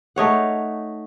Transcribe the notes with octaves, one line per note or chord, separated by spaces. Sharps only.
A3 D#4 C#5 F#5